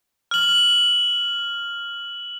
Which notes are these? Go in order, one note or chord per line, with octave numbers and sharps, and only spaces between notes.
F6 F#7